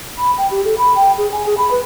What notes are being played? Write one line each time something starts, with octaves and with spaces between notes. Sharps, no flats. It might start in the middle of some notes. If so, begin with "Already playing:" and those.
B5
G5
G4
A4
B5
G5
G#4
G#5
G#4
B5
B4